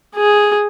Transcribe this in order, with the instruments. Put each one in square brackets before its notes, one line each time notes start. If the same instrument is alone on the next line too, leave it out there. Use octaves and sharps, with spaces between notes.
[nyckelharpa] G#4